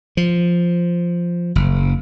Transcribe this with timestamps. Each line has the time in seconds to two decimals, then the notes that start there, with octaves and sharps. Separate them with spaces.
0.17 F3
1.55 F#1